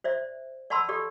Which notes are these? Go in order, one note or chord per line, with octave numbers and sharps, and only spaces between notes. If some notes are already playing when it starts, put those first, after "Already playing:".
C5 D5 E5
D5 F#5 A5 B5 C6 E6
G4 A4 D5